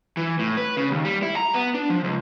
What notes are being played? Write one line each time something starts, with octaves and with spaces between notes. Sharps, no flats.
E3
A2
B4
C#3
D#2
G3
E4
A#5
B3
D4
F3
C#2